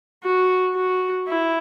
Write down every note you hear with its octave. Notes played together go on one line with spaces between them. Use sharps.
F#4
F#4
E4